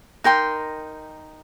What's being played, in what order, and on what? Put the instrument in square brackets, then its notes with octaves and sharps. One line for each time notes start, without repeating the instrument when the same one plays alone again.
[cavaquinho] D#4 A#4 G5 C6